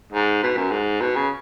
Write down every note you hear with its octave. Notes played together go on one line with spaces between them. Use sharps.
G#2
B2
F#2
G#2
B2
C#3